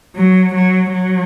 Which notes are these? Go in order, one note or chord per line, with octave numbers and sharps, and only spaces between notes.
F#3
F#3
F#3